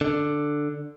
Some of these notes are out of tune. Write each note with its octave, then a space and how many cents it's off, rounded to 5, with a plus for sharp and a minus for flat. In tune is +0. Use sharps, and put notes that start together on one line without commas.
D3 +5